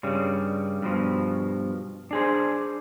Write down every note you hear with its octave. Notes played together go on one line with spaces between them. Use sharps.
G2 C#3 G3
G2 B2 F3
D4 G#4 C5